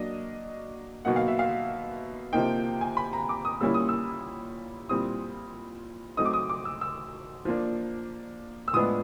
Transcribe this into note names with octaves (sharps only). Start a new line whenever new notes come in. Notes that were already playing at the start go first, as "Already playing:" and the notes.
Already playing: F#3 A#3 D4 D#5
B2 F#3 A#3 D#4 F#5
F5
E5
F5
C3 F3 A#3 D#4 G5
G#5
B5
A#5
D6
D#6
A#2 G3 A#3 C#4 E4 E6
D#6
E6
A#2 G3 C4 E4 D#6
F#3 A3 C4 D#4 D#6
D6
D#6
D6
E6
E6
F3 A#3 D4
E6
A2 F3 G#3 B3 D4 D#6